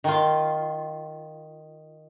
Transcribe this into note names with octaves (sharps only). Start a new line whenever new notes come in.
D#3 F4